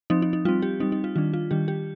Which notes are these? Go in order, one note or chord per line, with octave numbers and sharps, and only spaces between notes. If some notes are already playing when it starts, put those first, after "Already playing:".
F3 C4 D#4
D#4
D#4
G3 C4 F4
G4
G3 C4 D#4
D#4
F4
D#3 G3 D4 F4
F4
D#3 G3 D4 G4
G4